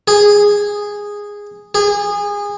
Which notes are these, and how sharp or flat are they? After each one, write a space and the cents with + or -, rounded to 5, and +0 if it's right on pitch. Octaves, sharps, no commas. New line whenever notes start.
G#4 -10
G#4 -25